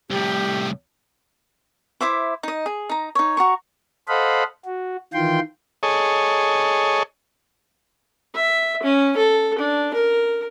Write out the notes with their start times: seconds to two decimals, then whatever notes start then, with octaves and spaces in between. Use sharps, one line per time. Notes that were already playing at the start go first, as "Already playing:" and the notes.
0.10 C2 A2 G4
2.01 E4 C5 E5 D6
2.43 D#4 D#5
2.66 G#4
2.89 D#4 A#5
3.15 D#4 C#5
3.37 F#4 A#5 C#6
4.08 A4 C5 D#5 F5 F#5 B5
4.65 F#4
5.14 D#3 E3 F4 G5 C6
5.83 G#4 A4 C#5 D#5
8.35 E5
8.83 C#4
9.16 A4
9.58 D4
9.94 A#4